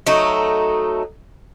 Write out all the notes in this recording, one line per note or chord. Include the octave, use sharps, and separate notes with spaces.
F#3 A3 D#4